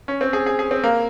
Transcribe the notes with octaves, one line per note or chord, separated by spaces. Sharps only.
C#4
C4
G#4
G#4
G#4
C4
A#3